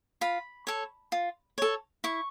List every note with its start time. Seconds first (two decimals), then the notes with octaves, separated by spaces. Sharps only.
0.21 F4 B5
0.67 A4 C#5
1.12 F4
1.58 A4 C#5
2.04 E4 C#6